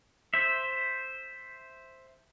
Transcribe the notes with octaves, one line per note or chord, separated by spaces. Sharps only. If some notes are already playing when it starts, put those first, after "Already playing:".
C5 E5